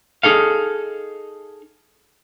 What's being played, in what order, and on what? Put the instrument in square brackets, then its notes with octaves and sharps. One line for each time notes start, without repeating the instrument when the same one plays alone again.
[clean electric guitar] D#4 G#4 A4 F5